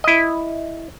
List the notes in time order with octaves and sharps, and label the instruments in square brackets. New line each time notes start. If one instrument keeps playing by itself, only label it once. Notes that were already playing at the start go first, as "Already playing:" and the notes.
[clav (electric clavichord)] E4 D#5